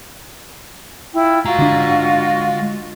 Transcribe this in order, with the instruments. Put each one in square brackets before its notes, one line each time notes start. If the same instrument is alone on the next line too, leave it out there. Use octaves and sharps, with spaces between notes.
[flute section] E4 F4 G5
[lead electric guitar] G#3 A#5 [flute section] F4 F#4
[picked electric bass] D3 D4